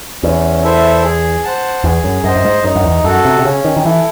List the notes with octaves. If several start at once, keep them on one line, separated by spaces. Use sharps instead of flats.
E2 C#4
E4 A4 C5 E5
G#4
C5 F#5 A5
E2 G#4
F#2
F#2 C5 D#5
F#2
G#2
F#2 D#4
F#2
E2
F#2 F#4 A4
C3
C3
C#3 C#4
D#3
D#3
E3 E4 A4